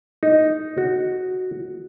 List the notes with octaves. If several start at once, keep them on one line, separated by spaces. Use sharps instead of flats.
D#4
F#4